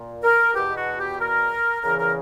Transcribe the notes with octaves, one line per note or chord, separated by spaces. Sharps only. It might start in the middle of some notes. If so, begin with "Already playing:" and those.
Already playing: A#2
A#4
E2 B2 G4
F#4
G4
A#4
E2 C#3 E3 A#4
A#4